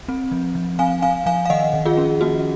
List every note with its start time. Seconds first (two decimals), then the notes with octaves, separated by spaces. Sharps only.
0.09 C4
0.32 F3
0.55 F3
0.79 C4 F5 G#5
1.02 C4 F5 G#5
1.26 F3 F5 G#5
1.45 F5
1.50 D#3 D#5 F#5
1.74 D#3
1.86 F4 G#4
1.97 C#4
2.21 A#3 F#4